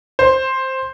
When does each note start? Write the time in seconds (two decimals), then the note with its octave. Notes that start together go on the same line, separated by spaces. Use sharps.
0.19 C5